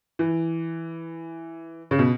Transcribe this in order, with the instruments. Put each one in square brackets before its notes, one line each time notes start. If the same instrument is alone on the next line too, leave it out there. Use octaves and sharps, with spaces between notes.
[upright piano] E3
C#3
B2